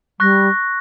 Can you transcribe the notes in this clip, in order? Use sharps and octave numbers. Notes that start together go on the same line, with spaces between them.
G3 C#6 F#6 A#6